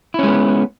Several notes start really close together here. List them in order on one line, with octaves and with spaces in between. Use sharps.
E4 C#4 G#3 B3